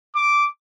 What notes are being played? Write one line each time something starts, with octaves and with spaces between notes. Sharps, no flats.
D6